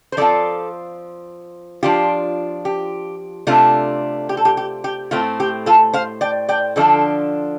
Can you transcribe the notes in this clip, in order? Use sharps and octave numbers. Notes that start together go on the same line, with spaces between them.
C5
F3 C4 F4 A4 D5
F3 D4 F4 G4
G4
C3 A3 D4 F4
G4
A4
G4
G4
G4
A2 A3 C4 F4
G4
F4 A4
C5 F5
D5 G5
D5 G5
D3 F3 D4 F4 A4 D5